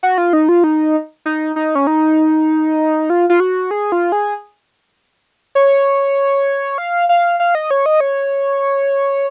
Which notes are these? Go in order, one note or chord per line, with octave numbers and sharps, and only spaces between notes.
F#4
F4
D#4
F4
D#4
D#4
D#4
C#4
D#4
F4
F4
F#4
G#4
F4
G#4
C#5
F5
F5
F5
D#5
C#5
D#5
C#5